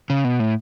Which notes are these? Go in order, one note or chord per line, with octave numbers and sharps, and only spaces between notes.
C#3
B2
A2